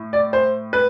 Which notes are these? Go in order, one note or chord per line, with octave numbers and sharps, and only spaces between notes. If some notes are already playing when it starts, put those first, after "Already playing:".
Already playing: A2
D5
C5
B4